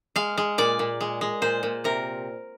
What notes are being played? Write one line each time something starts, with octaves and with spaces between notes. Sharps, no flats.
G#3 F5
G#3
A#2 D5
A#2
G#3
G#3
A#2 C5
A#2
C3 A#4